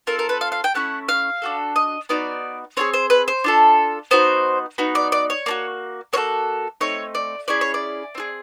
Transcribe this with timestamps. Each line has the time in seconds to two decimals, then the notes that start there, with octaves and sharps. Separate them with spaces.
0.07 C4 F4 A4 A#4
0.19 A#4
0.29 B4
0.41 F5
0.52 F5
0.64 G5
0.74 A3 C#4 E4 F#5
1.09 F5
1.42 D4 F#4 A4
1.76 D#5
2.09 B3 D#4 F#4 D5
2.77 C4 F4 G#4 C#5
2.94 C5
3.10 B4
3.28 C5
3.44 D4 F4 A4
4.11 B3 D#4 F#4 C5
4.78 B3 D#4 F#4
4.95 D5
5.12 D5
5.30 C#5
5.46 A#3 D4 F#4
6.13 A#3 D4 F#4 A4 C#5
6.81 A3 C4 D#4 C#5
7.15 D5
7.48 C#4 E4 G#4 D5
7.61 C#5
7.74 D5
8.15 C4 F4 G#4